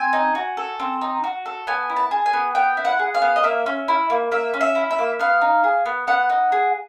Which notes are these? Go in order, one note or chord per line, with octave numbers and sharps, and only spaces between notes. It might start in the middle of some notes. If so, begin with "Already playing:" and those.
Already playing: C4 G#5
D#4
F#4
A4
C4
D#4
F#4
A4
B3 G#5
E4
A5
G#4
G#5
B3
B3 G5
E4
F#5
G#4
F5
B3
D#5
A#3 E5
C#4
E4
A#3
A#3 E5
C#4
E5
E4
E5
A#3
B3 F5
D#4
G#4
B3
B3 F#5
D#4
G#4